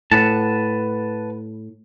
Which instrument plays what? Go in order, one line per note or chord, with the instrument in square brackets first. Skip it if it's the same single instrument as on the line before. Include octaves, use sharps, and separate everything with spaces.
[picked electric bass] A2 [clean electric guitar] B4 F#5 A5